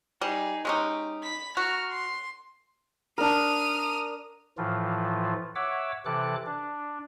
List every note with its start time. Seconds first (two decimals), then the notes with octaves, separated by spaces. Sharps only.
0.21 G3 D#4 G#4
0.65 G#3 C#4 D#4 G4
1.23 B5 B6
1.57 F#4 A#5 F6
1.89 C6
3.18 D4 A#4 D#6 F6
4.58 A2 E3 F3 F4
5.55 C#5 E5 F#5 D6 E6
6.05 C3 E3 A4 D6 F#6
6.46 D4